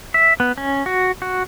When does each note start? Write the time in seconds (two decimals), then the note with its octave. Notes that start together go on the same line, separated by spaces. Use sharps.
0.14 E5
0.40 B3
0.58 C#4
0.86 F#4
1.22 F#4